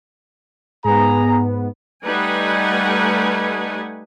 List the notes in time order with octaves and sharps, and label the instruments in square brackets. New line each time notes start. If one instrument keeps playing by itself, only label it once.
[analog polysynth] G#2 B3 [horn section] G#4 A#5
[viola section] G3 A3 D#4 B4 F#5 G#5